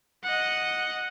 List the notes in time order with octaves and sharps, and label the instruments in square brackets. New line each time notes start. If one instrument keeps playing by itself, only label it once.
[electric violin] D#5 F#5